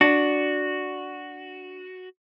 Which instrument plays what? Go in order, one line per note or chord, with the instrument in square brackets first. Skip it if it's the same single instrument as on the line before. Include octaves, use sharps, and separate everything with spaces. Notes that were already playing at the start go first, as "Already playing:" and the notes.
[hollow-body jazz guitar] D4 [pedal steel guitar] F#4